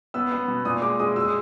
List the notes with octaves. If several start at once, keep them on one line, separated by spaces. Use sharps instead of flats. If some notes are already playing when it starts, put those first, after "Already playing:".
B3 E6
B3
B2
A#2 D#6
G#3 D6
G#3 D#6
G#3 E6
D#6